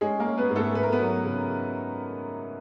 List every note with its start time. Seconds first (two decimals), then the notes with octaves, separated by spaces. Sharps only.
0.01 G#3 C#4 G#4
0.20 A#3 A#4
0.25 C#4
0.38 B3 B4
0.50 G#2
0.56 A3 A4
0.74 A3 B4
0.83 A#4
0.92 B3 B4
0.99 F#3
1.24 C#3